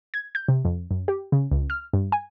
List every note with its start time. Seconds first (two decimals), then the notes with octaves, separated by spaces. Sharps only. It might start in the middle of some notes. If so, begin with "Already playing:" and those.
0.14 G#6
0.35 G6
0.48 C3
0.65 F2
0.91 F#2
1.08 G4
1.32 C#3
1.52 C#2
1.70 F6
1.93 G2
2.12 G#5